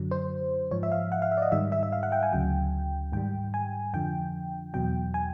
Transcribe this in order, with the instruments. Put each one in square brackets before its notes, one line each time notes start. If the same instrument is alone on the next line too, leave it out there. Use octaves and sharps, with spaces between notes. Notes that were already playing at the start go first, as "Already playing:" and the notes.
Already playing: [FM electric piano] F#2 D3 F#3
C5
G#2 F3 C#5
E5
F5
F#5
F5
E5
D5
D#5
G#2 D#3 G3 E5
E5
E5
F5
F#5
G5
G#5
D2 C#3 F#3 G5
G#2 D#3 G3 G5
G#5
F2 D3 F3 G5
E2 B2 F#3 G5
G#5